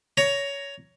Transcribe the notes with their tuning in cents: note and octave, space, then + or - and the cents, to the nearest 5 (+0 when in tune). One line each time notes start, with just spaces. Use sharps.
C#5 +15 A#5 +0